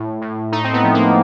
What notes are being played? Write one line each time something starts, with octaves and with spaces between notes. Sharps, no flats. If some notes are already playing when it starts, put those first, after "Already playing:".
Already playing: A2
A2
A3 D#4
C4
B3
F3
A#3